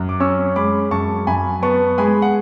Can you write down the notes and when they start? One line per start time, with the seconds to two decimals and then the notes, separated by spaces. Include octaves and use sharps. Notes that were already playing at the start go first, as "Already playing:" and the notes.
Already playing: F#2
0.09 D6
0.20 C#4 C#6 E6
0.56 G#3 B5 D6
0.91 F#2 A5 C#6
1.27 F#2 G#5 B5
1.62 B3 A5 C#6
1.98 G#3 G#5 B5
2.22 F#5